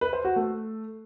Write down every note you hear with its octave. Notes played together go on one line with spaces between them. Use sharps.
B4
C5
F#4
A3